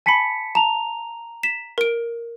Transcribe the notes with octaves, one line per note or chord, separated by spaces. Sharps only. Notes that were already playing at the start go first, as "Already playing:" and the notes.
G#5 A5 B5 B6 C#7
A5 A#5 F7
B6 E7
A#4 D7